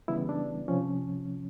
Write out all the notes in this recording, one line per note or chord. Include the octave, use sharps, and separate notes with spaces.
C#3 E3 G3 B3 E4
D4
C3 F3 C#4